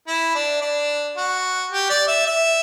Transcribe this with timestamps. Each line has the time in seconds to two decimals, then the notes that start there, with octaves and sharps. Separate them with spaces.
0.07 E4
0.35 D4
0.61 D4
1.17 F#4
1.72 G4
1.90 D5
2.08 E5
2.26 E5